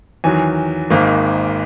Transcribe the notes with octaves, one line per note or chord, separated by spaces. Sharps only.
E2 D#3 F#3 G#5
G#1 G#2 D#3 A#3